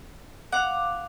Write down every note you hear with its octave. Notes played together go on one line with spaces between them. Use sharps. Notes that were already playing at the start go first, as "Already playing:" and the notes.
F5 F#5 D6